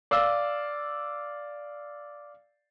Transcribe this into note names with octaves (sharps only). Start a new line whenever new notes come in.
D5 F5 E6